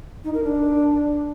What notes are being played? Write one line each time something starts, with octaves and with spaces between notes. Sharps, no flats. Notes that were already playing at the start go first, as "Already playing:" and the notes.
D#4
A#4
D4